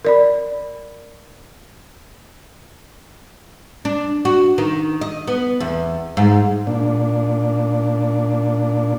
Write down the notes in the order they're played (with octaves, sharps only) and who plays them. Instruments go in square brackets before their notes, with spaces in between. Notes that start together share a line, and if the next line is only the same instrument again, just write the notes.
[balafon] A#4 D5 B5
[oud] D4
F#4
D#3
D#5
B3
E2
G#2
[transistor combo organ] A#2 D4